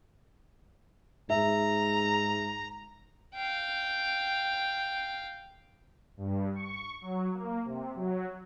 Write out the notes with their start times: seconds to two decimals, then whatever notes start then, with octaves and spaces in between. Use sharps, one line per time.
1.30 G#2 E5 A#5
3.34 F5 G5
6.17 G2
6.55 C#6
7.01 F#3
7.34 A#3
7.65 C3
7.95 F#3